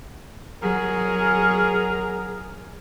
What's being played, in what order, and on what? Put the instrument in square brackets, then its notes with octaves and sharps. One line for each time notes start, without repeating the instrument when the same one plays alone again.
[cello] F#3 [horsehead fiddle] G#4 [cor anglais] A#4